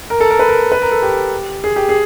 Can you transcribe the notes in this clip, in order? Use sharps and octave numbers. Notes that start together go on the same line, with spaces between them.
A#4
A4
A#4
B4
A#4
B4
A#4
A4
G4
G#4
G4
G#4